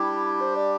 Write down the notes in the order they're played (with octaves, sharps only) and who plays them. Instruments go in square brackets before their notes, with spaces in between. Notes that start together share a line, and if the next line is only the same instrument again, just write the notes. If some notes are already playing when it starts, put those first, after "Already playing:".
Already playing: [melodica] G3 D4 G4 [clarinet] E4
[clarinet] C5
D5